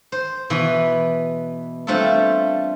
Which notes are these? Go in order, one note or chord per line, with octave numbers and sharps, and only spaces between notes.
C5
B2 E3 B4 B5
G3 A3 C4 D4 F4 A4